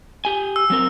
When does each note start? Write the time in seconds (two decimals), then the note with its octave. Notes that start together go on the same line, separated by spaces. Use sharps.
0.25 G4 G#5
0.56 E6
0.70 F#3 C4 A#4